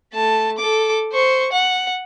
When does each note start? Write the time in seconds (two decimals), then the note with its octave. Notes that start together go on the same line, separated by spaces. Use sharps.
0.13 A3 A5
0.58 A4 D6
1.12 C5 C#6
1.53 F#5